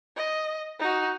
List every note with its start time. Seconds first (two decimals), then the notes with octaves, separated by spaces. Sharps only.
0.16 D#5
0.79 D#4 F#4